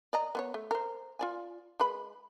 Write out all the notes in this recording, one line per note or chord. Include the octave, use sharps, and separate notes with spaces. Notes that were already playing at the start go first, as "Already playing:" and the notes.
D5 D#5 A#5
B3 C4 C#5
A3
A#4 C5
F4 D5 G#5
G#3 B4 B5